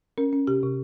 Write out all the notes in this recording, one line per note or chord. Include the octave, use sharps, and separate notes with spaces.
C#4 A#4
C#4
C3 G4
C3